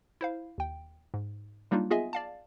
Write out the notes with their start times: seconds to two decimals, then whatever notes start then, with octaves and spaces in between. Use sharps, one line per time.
0.21 E4 C5 F5
0.58 D#2 G5
1.14 G#2
1.71 F#3 G3 A#3 D4 D#4 F4
1.91 B3 F4 G#4 D#5 E5 G#5
2.13 D5 F5 A5